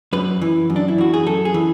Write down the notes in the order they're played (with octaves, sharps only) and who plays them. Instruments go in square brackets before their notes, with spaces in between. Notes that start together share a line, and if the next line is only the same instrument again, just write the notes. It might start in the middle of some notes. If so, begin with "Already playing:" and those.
[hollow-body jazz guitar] F#2 B4
E3
F#2
D4
E4
E3 F#4
G#4
F#2 A4
G#4
E3